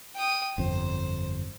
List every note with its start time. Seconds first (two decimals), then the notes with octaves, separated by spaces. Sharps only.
0.15 G5 D#6
0.58 G1 F2 C5